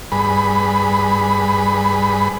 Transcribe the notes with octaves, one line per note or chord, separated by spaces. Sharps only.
G2 G#4 B4 B5